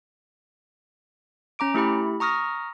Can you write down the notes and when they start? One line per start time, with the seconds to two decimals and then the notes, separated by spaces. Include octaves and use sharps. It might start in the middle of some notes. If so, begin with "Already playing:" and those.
1.59 C#4 A#5 D6 D7
1.74 A3 E4 G4 B5
2.20 A#5 C#6 D#6 F6 A#6